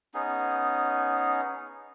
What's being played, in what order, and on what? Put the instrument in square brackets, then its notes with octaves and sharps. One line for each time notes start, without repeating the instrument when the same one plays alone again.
[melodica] B3 C#4 D#4 G#4